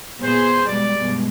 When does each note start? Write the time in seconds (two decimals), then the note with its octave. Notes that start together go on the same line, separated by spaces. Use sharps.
0.22 A#2 B3 G#4 C5
0.66 B2 G3 G#3 D5
0.98 G2 B2 G#3